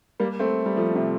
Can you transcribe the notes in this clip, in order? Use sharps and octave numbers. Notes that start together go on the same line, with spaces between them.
G3 A#3
A3 C4
G3
F3 A3
C3